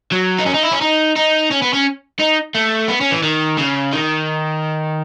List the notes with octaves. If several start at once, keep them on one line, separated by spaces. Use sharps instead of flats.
F#3
D#4
C#4
D#4
E4
C#4
D#4
D#4
C#4
B3
C#4
D#4
A3
B3
C#4
E3
D#3
C#3
D#3